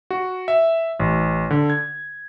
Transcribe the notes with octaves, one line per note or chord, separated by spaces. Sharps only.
F#4
E5
A1
D3
G#6